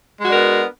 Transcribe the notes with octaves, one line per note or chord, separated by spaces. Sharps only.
G#3 B3 D4 F#4 A#4